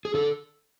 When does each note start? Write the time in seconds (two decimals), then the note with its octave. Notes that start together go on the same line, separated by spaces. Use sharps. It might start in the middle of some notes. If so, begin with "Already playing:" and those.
0.05 G#4
0.14 D3 A4